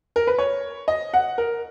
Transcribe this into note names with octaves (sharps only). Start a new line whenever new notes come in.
A#4
B4
C#5
D#5
F#5
A#4